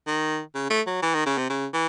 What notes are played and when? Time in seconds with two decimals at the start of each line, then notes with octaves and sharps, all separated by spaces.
0.07 D#3
0.55 C#3
0.70 A3
0.87 F#3
1.02 E3
1.14 D#3
1.26 C#3
1.38 C3
1.50 C#3
1.73 E3